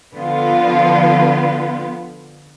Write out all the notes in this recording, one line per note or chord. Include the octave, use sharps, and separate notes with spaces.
D3 F3 B3 F4